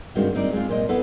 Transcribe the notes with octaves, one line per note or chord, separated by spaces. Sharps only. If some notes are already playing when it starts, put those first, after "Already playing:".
G2 D#3 G#3 C4 F#4
C4 D#4 A#4 D5
G#3 C4 F4
A#2 C5 D#5
B3 E4 A4 B4 C5